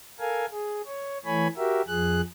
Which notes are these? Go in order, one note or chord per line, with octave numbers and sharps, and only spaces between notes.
A4 A#4 F5 G#5
G#4
C#5
E3 A3 C#5 G#5 B5
F#4 G4 A#4 E5
F2 F3 G#4 F#6